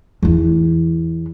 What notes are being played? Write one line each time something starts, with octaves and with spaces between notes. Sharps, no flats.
E2 E3